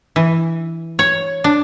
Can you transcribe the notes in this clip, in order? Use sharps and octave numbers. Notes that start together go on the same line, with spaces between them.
E3
C#5
D4